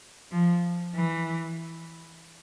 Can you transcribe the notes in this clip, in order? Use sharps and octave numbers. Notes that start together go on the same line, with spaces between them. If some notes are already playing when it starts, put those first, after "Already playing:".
F3
E3